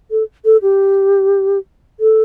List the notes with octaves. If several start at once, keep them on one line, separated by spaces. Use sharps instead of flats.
A4
A4
G4
A4